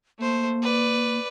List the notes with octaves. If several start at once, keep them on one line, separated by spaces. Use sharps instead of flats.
A3 A#3 C5
B4 D5